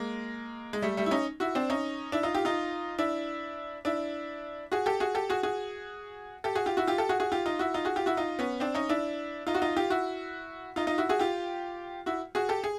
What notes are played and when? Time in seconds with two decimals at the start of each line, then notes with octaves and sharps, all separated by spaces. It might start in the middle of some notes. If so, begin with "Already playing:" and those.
Already playing: G#3 A#3
0.73 G#3
0.82 G3 A3
0.97 G3 A3
1.06 E4
1.11 C#4 D#4
1.40 E4 F#4
1.55 C4 D4
1.70 C#4 D#4
2.12 D4 E4
2.23 D#4 F4
2.35 F4 G4
2.45 D#4 F4
2.98 D4 E4
3.85 D4 E4
4.72 F#4 G#4
4.86 G4 A4
5.00 F#4 G#4
5.15 G4 A4
5.30 F#4 G#4
5.43 F#4 G#4
6.44 G4 A4
6.55 F#4 G#4
6.66 F4 G4
6.77 E4 F#4
6.87 F4 G4
6.98 G4 A4
7.09 F#4 G#4
7.20 F#4 G#4
7.32 F4 G4
7.46 D#4 F4
7.59 E4 F#4
7.74 D#4 F4
7.85 F#4 G#4
7.96 F4 G4
8.06 E4 F#4
8.17 D#4 F4
8.39 B3 C#4
8.60 C4 D4
8.75 C#4 D#4
8.89 D4 E4
9.47 D#4 F4
9.55 F#4
9.62 D#4 F4
9.77 F4 G4
9.90 E4 F#4
10.76 D#4 F4
10.87 D#4 F4
10.98 E4 F#4
11.09 F#4 G#4
11.19 F4 G4
12.06 E4 F#4
12.35 F#4 G#4
12.49 G4 A4
12.64 G#4